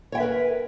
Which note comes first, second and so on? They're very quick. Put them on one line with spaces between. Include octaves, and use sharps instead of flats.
C#5 G5 E5 B4 A#4